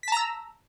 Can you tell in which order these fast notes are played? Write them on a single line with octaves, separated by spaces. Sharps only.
B6 A5 A#5 E6